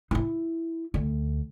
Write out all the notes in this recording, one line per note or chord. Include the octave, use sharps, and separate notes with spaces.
D#4 E4
D2